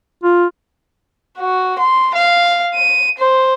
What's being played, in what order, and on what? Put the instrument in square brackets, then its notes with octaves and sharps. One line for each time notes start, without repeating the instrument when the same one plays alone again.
[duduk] F4
[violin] F#4
C6
F5
D#7
C5